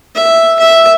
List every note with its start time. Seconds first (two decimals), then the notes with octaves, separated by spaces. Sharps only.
0.15 E5
0.60 E5